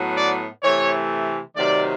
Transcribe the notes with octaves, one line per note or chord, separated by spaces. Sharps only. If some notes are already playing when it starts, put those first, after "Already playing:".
Already playing: A2 F#3 B3
D5
C3 E3 A3 C#5
C3 D#3 F#3 A3 D5